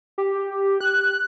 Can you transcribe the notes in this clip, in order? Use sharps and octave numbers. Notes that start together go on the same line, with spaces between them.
G4
F#6